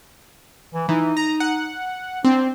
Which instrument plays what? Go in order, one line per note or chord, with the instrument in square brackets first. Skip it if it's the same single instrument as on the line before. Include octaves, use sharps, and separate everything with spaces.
[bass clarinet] E3
[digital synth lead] E3 [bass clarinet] D#4
[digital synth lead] A#5
F#5
[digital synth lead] C4 [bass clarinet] D4